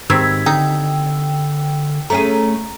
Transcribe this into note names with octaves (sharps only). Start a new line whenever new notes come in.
G#2 D#3 G3 C4 E6 G#6 B6
D3 D#4 G5 E6
A3 C#4 G#4 A#5